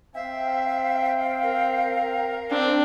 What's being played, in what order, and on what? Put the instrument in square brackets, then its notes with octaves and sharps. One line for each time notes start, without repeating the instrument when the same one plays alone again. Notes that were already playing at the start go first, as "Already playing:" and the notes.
[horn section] C4 G5 [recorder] E5 [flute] F5
[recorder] A#4
[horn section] C4 [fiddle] D4